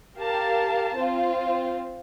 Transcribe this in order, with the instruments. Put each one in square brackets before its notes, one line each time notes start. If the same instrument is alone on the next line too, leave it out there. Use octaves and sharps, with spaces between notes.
[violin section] G4 A#4 F5 A5
C4 F4 C5